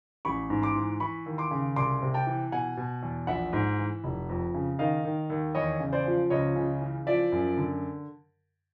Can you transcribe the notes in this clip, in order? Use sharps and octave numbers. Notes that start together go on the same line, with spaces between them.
A1 B5 C#6
G#2
C6 D6
E3
E3 B5 C#6
D#2
C6 D6
C#3
C2 C6 D6
C3
G5 A5
E3
B2 F#5 G#5
B2
E2
A#1 E5 F#5
G#2
E3
F1
F2
C#3
D#3 D#5 F5
D#3
D#2
E2 C#5 D#5
C#3
C5 D5
F3
C#2 C#5 D#5
C#3
E3
F3 D5 E5
F#2
D3